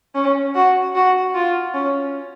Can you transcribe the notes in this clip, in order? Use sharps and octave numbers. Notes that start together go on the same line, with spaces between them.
C#4
F#4
F#4
F4
C#4